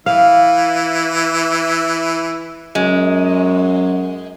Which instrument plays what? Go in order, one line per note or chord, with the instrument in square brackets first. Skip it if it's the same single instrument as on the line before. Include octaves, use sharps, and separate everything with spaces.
[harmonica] E3 E5 [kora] F5
[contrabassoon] F#2 [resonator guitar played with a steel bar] G#3